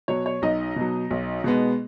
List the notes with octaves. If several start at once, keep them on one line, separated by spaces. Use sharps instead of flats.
B2 F#3 C#5
C#5
B1 D#4 D#5
B2 F#3
B1
B2 G#3 B3